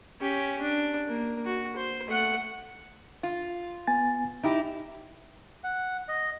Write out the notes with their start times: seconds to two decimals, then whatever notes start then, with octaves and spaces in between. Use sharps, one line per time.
0.20 C#4 G4
0.61 D4
1.08 A#3
1.45 F#4
1.76 C5
2.07 A3 F#5
3.23 F4
3.87 B3 G#5 A6
4.43 F2 D#4 E4 G4
5.64 F#5
6.08 D#5